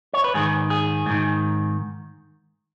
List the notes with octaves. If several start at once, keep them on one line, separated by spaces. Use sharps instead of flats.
C#5
B4
G#2 D#3 G#4
G#4
G#2 D#3